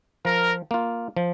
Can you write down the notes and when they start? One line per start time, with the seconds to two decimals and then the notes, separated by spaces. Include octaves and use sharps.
0.25 F3 A#4
0.71 A#3 F4
1.17 F3